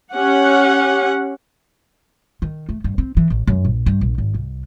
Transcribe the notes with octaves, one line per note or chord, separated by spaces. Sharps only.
C#4 G4 F#5
D#3
A3
G2
C4
E3
A1
F#2
A#1
G2
A#1
G#1
C2